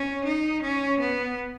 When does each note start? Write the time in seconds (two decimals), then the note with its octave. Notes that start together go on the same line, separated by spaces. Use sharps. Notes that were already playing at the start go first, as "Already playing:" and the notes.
Already playing: C#4
0.24 D#4
0.62 C#4
0.99 B3